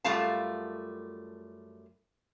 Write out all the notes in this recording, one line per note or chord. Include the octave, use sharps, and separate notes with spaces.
F#2 G3 A3 F4 F5 A5